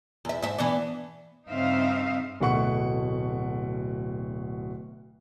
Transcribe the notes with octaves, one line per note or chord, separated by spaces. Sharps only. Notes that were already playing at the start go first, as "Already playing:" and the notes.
E2 E5
G#2 E5
E3 B3 D4
G2 C#3 C4 D#4 E5 F5
D1 B2 A3 F#5 C#6 C#7